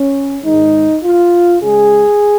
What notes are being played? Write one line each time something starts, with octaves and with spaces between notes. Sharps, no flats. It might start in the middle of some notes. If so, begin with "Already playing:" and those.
Already playing: C#4
G#2 D#3 G#3 D#4
F4
C#3 G#3 G#4